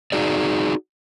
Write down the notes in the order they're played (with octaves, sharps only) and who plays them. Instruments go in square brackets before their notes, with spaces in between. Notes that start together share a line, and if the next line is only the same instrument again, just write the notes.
[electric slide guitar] D#4 F#4 G#4 D5